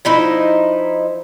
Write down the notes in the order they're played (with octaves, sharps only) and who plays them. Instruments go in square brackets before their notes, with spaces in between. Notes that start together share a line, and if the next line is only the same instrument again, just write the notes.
[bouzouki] F3 D#4 E4